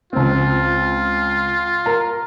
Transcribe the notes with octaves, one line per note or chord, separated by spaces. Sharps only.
C#2 C4 F4
A#4 A#5